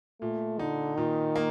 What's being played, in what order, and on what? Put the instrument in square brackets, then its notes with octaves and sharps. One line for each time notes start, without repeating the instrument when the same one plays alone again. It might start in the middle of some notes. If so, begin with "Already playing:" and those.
[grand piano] A#2 [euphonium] A3
[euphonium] D3 [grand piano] D#4
[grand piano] A#2 [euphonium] D#3
[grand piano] A#3